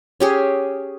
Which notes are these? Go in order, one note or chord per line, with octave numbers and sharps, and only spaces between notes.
C#4 G4 G#4